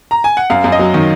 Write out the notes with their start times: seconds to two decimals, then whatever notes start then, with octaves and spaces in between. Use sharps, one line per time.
0.11 A#5
0.24 G#5
0.37 F#5
0.50 F#2 F5
0.64 F#2
0.72 D#5
0.79 F#3
0.94 D#3